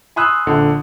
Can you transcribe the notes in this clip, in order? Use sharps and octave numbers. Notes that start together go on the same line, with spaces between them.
G#5 B5 C6 D#6 E6 F#6
A#1 D3